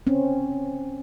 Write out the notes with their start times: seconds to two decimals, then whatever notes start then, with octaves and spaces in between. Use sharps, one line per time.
0.07 C4 C#4